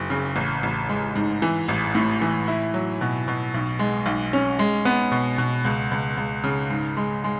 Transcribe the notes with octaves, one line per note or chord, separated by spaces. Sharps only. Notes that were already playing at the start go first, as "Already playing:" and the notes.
Already playing: F#1 F#3
C#3
A1
A1
G#3
G#2
E3
A1
A2
E3
E4
F#3
B2
B2
B1
G#3
B1
C#4
G#3
B3
B2
B2
C#2
C#2
C#2
C#3
G#2
G#3
G#3